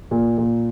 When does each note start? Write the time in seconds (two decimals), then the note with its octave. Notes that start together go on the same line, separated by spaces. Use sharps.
0.11 A#2
0.38 A#2